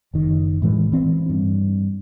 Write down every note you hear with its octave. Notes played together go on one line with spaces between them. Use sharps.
F#1 D#3
A2 E3 G#3
E3 C4
G2